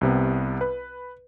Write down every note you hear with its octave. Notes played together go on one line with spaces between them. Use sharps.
C2 C3 B3
B4